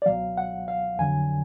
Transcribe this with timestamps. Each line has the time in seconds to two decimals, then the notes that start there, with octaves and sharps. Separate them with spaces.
0.02 D5
0.06 C#2 B2 F#3 F5
0.37 F#5
0.68 F5
0.99 F2 D3 F#3 G#5